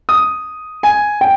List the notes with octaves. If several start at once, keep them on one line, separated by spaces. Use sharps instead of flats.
D#6
G#5
G5